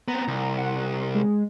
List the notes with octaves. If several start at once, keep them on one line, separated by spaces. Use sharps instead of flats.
B3 C4 A#5
C2
F#5
G#3